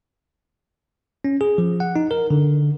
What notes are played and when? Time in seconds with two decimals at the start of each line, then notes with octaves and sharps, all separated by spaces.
1.24 C#4
1.41 G#4
1.58 F3
1.80 F#5
1.96 D#4
2.11 A#4
2.31 D3